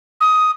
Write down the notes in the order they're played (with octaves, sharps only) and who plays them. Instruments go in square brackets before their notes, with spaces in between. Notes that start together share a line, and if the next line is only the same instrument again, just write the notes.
[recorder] D#6